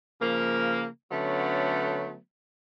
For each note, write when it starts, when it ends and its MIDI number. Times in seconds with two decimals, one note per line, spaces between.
0.21 0.86 49
0.21 0.86 53
0.21 0.86 58
1.11 2.17 50
1.11 2.17 54
1.11 2.17 57
1.11 2.17 59
1.11 2.17 61